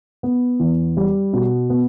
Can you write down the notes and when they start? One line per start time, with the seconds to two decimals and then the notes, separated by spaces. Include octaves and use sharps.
0.23 B3
0.60 E2
0.97 G3
1.33 B2
1.70 B3